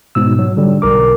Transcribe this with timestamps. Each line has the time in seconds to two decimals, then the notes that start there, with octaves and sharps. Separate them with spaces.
0.15 G#2 B2 E6
0.39 F#3
0.57 D3 G3
0.82 B1 A#4 D6